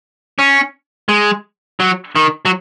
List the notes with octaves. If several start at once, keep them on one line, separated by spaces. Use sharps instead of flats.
C#4
G#3
F#3
D#3
F#3